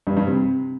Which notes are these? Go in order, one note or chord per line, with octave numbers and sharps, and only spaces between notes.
G2
G2
C3